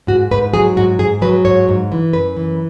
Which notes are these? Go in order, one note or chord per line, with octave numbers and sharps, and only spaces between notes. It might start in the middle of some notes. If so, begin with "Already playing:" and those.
G#2 F#4
G#2 B4
F#3 G#4
G#2 F#4
G#2 G#4
F#3 B4
G#2 C#5
G#2
E3
F#2 B4
E3